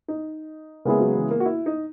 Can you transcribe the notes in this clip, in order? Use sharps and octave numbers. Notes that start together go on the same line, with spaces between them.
D#4
C#3 G#3 A#3 B3 E4 G#4
F#3
E3
A#3
F#4
E4
D#4